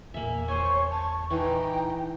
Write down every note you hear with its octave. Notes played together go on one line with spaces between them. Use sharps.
E2 A#2 A#3 E5 G#5
C5 C#5 G#5 C#6
A5 C#6
E3 D#4 G5